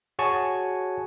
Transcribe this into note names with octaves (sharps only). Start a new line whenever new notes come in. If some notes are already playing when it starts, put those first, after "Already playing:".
F#4 G#4 C#5 G#5 A5 C#6